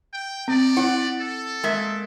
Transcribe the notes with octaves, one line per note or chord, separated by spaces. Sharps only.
G5
B3 C4 D5
E4 F#5
A4
G#3 A#3 E5